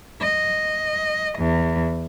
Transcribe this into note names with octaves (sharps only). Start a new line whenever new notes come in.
D#5
E2